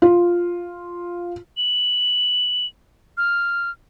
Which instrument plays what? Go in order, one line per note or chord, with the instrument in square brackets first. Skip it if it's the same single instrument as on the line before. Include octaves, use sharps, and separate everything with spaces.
[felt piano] F4
[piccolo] F#7
F6